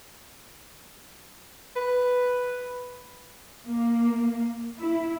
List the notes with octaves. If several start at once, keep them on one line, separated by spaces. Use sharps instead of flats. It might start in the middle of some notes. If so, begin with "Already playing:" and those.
B4
A#3
E4